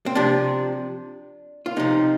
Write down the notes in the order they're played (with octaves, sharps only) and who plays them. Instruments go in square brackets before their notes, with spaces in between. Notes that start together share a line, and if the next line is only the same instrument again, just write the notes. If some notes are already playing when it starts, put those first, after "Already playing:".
[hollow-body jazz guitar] C4
C3 F3 D4
F4
C3 F3 D#4